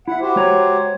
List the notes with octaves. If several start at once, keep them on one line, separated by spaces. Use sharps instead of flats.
E4 E5 F#5
F#4 G4 C5
G#3 C#5 A#5